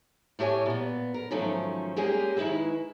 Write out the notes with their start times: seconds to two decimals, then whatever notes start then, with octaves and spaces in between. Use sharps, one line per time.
0.39 A2 A3 G4 C#5 G#5
0.66 A#2 B3
1.14 A#4
1.31 G#2 D#3 F3 F#3 A3 C#4
1.96 G3 G#3 A#3 C#4 G4 G#4
2.37 D#3 G#3 E4 B4 E5